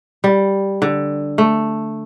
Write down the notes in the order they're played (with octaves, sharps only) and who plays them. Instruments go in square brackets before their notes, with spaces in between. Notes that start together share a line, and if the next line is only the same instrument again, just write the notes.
[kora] G3
D3
A3